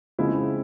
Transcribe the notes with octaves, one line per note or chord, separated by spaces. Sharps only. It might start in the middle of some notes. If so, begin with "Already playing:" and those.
C#3 F3 G#3 C4 E4